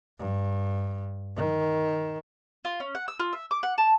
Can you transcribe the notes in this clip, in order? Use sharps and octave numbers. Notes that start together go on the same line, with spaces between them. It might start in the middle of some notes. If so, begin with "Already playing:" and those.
G2
D#3
F4
C#4
F#5
E6
F4
E5
D6
F#5
A5